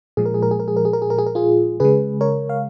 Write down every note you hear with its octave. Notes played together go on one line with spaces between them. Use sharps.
A#2 F3 G#3 G#4
A#4
G#4
A#4
G#4
A#4
G#4
A#4
G#4
A#4
G#4
A#4
G#4
A#4
F4 G#4
C#3 G#3 G#4 B4
A#4 C#5
F5